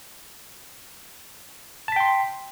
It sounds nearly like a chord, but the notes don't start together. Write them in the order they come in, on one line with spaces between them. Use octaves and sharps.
A5 B6 G5 C6